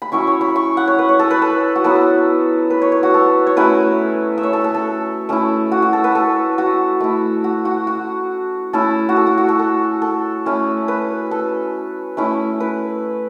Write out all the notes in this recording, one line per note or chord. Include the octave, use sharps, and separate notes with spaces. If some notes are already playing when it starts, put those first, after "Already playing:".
B5
F#3 C#4 E4 C#6
C#5
B5
C#6
F#5
C#5
B4
C#5
A4
B4
A4
F#4
F#3 B3 E4 A4
B4
C#5
C#5
F#4
A4
C#5
F#3 A3 C#4 E4 B4
E5
C#5
A4
A4
A4
A3 C#4 E4
F#4
F#4
A4
B4
A4
F#4
A3 E4
F#4
F#4
F#4
A3 C#4 E4 A4
F#4
A4
F#4
F#4
A4
A4
A4
A3 C#4 E4
B4
A4
A3 C#4 E4
B4